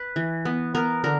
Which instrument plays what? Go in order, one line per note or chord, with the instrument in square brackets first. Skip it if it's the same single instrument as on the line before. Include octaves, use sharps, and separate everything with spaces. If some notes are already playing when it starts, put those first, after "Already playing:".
Already playing: [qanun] B4
E3
B3
B3 A#4
D3 A#4